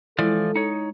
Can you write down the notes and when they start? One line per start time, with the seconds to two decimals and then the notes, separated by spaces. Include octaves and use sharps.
0.19 E3 F3 G#3 E4 A4 D5
0.56 D#4 C#5